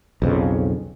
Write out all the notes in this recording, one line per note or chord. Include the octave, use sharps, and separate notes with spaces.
B1 F2 C#3